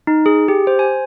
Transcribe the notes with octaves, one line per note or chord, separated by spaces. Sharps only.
D#4
G#4
G4
C5
G#5